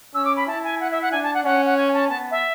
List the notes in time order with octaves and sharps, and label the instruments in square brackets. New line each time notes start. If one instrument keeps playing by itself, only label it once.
[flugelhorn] C#4 [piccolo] E6
[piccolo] D6
B5
[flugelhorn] E4 [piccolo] A5
[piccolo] G#5
F#5
E5
F#5
[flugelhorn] D4 [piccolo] G#5
[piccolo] A5
F#5
[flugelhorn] C#4 [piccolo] F#5
[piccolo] F#5
G#5
A5
[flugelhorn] B3 [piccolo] A5
[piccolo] E5